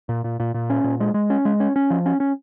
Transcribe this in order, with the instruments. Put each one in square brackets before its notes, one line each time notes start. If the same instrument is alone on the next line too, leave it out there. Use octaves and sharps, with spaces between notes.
[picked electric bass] A#2
A#2
A#2
A#2
C#4
A#2
G#3
G#3
C#4
G#3
C#4
C#4
F3
C#4
C#4